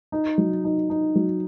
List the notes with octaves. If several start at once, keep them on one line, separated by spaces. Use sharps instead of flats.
D#4
F#3
D#4
D#4
F#3